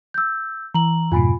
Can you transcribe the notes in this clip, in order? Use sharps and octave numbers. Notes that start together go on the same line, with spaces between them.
E6 G6
E3 A#5 F#7
F2 G#2 B2 F4 G#5 B5